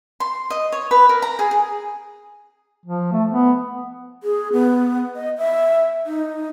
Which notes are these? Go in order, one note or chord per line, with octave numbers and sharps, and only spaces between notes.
C6
D#5
C#5
B4
A#4
A#5
G#4
G#4
F3
A3
B3
G#4
B3
D#5
E5
D#4